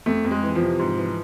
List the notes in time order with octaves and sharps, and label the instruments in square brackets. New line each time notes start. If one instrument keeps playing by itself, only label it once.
[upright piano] F2 A3
F2
G#3
E3
F3
C3
G#2
E3